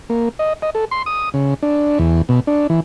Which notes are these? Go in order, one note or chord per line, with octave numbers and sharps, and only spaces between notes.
A#3
D#5
D#5
A4
C6
D#6
C#3
D4
E2
B2
D4
E3